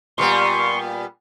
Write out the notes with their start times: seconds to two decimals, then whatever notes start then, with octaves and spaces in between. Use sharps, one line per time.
0.18 A#2 G3 B3 C6 C#6